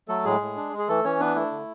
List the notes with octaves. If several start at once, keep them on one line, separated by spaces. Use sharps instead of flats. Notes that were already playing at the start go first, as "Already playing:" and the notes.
F#3 A3 A4
A2 G#3 G#4
A2
D4
G#3
G#4
E3 A3 A4
E3 C#4 C#5
B3 D4 B4
A3 E4
D3